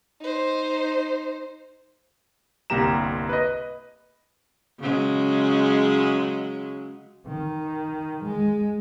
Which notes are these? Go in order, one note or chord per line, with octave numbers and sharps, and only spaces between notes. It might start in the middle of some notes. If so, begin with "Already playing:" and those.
D#4 C5
G1 C2 A#3 G4 A#5 E7
B4 D#5
C#3 F#3 G#3
D#3
G#3